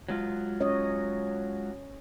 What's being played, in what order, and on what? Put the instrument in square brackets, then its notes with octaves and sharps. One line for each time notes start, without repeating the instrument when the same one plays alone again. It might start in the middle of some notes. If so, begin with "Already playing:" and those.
[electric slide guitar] F#3 G#3 F4
[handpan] C#4 C#5 D#5